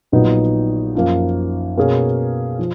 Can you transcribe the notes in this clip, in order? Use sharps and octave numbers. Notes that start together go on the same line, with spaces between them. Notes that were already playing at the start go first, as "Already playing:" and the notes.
A#1 A#2 F#3 B3 D#4
F#2 F3 A#3
B2 A#3 C#4 G#4
F3